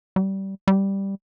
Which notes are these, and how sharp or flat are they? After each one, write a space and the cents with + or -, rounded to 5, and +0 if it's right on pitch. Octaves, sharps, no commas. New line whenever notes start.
G3 -20
G3 +0